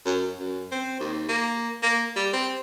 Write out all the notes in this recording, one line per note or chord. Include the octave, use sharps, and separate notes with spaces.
F#2
F#2
C4
D#2
A#3
A#3
G3
C4